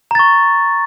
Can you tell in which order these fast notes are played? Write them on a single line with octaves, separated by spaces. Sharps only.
A#5 A6 C#6